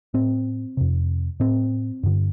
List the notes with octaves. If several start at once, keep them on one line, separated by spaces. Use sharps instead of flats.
A2 C4
F2 C3
A2 C4
G2 D3